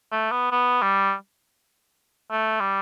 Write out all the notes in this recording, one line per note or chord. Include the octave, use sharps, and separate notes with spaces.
A3
B3
B3
G3
A3
G3